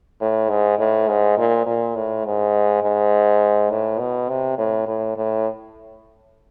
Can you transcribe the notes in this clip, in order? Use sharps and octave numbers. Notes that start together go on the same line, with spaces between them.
A2
G#2
A2
G#2
A#2
A#2
A2
G#2
G#2
A2
B2
C3
A2
A2
A2